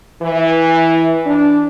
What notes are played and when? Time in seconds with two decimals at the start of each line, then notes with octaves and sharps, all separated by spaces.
0.22 E3
1.26 D4